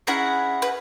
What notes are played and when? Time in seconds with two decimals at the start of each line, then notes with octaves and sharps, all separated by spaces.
0.07 C#4 E4 G#4 F#5 A#5
0.62 B4